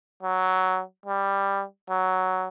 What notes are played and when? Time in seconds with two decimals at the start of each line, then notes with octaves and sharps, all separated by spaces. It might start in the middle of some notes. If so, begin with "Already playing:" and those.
0.23 F#3
1.05 G3
1.90 F#3